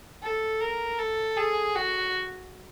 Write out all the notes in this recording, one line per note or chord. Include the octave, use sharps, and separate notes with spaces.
A4
A#4
A4
G#4
F#4